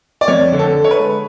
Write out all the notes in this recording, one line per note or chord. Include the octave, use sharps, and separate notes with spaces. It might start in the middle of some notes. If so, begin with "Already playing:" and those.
D5
F2 C#5
D3
A4
D3
C#5
B4
G#3